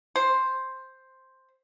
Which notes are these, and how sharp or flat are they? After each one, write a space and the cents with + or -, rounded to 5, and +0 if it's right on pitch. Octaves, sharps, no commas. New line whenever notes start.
C5 +5